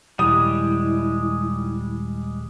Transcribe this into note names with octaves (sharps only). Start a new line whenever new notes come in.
D#1 G3 G#3 E4 D#6